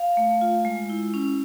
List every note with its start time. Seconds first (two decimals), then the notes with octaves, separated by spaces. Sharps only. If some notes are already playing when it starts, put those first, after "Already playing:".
Already playing: F5
0.17 A3
0.41 F4
0.65 G#3
0.90 E4
1.14 C#4